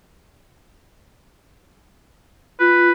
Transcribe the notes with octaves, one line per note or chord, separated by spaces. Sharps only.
F4 B4